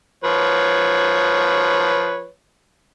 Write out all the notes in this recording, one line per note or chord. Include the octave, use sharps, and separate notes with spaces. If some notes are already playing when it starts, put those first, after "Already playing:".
F3 B4 C#5